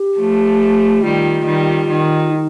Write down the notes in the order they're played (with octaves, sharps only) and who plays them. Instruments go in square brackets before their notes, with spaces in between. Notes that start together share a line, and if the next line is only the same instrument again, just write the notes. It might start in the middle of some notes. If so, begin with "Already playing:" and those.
Already playing: [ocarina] G4
[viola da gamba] F3 A3
[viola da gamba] D#3 G3 [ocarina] F4
[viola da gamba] D#3 G3
D#3
[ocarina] D#4